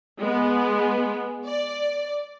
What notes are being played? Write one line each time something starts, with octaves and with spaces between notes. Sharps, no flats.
G#3 B3
D5